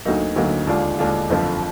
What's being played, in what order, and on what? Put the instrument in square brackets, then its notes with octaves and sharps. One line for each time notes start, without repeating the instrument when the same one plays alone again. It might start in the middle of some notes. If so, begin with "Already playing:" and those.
[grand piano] D2 D3 F#3 A#3 D#4
D2 D3 F#3 A#3 D#4
D#2 D3 G#3 D4 F4
D#2 D3 G#3 D4 F4
F#1 F2 D3 F3